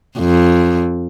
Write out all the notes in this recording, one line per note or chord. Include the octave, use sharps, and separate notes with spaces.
F2